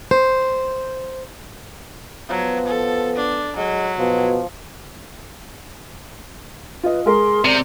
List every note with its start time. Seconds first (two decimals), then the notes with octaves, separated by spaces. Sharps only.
0.11 C5
2.29 F3 F#3 B3
2.67 A4
3.16 D4
3.57 F#3 G#3
3.99 B2 F3
6.83 F4 B4 D#5
7.06 G#3 G#4 A#4 C6
7.45 C3 D5